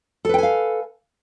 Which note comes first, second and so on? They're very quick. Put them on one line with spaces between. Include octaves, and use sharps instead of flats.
A4 B4 G5 G#5 F5